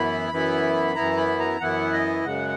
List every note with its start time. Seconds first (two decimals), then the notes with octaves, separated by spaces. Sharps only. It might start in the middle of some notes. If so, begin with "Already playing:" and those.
Already playing: F#2 E3 B3 E4 B5
0.31 F#2 E3 B3 E4
0.95 F#2 E3 B3 E4 A#5
1.17 B5
1.39 A#5
1.61 F#2 E3 B3 E4 F#5
1.93 D#5
2.25 F#2 C#3 G#3 F#5